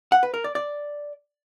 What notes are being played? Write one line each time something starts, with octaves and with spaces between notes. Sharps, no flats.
F#5
B4
A#4
D5
D5